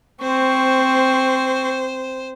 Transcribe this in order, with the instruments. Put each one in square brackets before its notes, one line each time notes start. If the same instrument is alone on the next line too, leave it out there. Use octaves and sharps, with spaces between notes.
[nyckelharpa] C4 C#6 [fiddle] C5